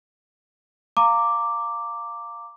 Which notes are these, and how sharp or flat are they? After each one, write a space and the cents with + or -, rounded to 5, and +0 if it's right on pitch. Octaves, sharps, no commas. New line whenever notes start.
F5 +0 A#5 -20 D6 +0